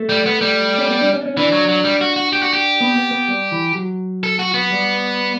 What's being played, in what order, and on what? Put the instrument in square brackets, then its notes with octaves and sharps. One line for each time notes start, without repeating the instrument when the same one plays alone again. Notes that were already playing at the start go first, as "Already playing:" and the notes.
Already playing: [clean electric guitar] A3
[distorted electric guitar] G3
B3
G3
[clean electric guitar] C#4
B3
D4
C#4
D4
C#4
[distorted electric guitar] E3 [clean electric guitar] D4
[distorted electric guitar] F#3
F#3
G3
F#4
F#4
G4
F#4
G4
[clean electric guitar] B3
B3
B3
G3
E3
F#3
[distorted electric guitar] A4
F#4
B3
[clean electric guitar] G3